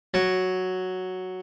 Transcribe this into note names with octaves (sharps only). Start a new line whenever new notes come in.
F#3